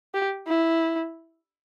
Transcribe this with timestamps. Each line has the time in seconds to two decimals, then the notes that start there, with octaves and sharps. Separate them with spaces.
0.14 G4
0.48 E4